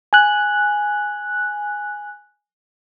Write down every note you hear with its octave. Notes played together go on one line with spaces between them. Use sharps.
G#5 F#6